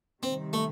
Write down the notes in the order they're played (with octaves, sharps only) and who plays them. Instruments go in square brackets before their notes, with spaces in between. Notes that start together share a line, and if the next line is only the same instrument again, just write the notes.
[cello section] C3 D#3 G3 [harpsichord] C4
[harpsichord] A3